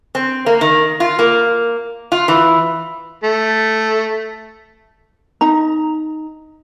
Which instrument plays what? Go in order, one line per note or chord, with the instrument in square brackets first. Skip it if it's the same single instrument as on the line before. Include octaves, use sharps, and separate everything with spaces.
[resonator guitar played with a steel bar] C4
A#3
D#3
F4
A#3
F4
E3
[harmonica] A3
[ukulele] D#4 A#5